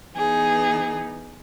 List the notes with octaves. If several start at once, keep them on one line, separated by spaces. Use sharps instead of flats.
E3 B3 D#4 G#4